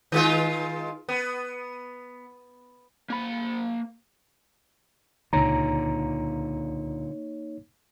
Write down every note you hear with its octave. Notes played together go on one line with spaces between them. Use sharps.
D#3 G#3 F4
B3
A#3 B5
C#2 A#2 D3 A#3 D#4 C#5 A#5